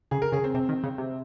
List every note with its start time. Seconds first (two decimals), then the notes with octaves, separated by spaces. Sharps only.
0.11 C#3 G#4
0.22 A#4
0.32 C#3 G#4
0.44 C4
0.54 C3 C4
0.69 D#3
0.84 C#3
0.98 C3